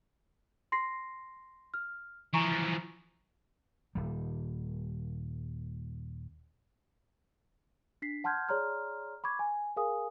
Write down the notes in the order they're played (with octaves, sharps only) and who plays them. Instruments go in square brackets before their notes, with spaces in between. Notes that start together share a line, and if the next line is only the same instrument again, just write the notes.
[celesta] C6 A#6 C7
F6
[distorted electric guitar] E3 F3 [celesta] G#5 A#5 C#6
[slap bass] D#1 G3
[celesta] D4 B6 C7
F#5 A5 C6 F6 G6 G#6
G#4 C#5 D5 A#5 C6 F6
B5 C#6 D6 G#6
G#5
G#4 A#4 F5 G#5 D#6